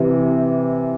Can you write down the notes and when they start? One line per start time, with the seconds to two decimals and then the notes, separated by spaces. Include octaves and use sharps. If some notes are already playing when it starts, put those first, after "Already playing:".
Already playing: C3 E3